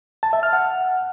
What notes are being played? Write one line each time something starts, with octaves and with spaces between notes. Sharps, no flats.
A5
E5
F6
F#5